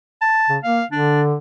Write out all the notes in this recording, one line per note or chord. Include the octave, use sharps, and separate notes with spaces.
A5
C#3
A#3 F5
D3 D4